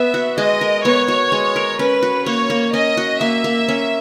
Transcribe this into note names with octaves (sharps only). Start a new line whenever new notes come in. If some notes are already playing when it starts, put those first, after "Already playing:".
Already playing: B3 E5
F#4
G#3 D#5
A#4
B3 C#5
F#4
G#3
A#4
C#4 B4
F#4
A#3 C#5
A#3
C#4 D#5
F#4
A#3 E5
A#3
C#4